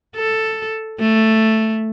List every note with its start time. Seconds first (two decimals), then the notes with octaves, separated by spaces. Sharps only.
0.16 A4
0.99 A3